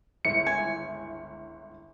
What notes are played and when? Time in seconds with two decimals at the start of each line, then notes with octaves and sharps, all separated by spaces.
0.25 G1 C#2 E4 C#7
0.47 G#5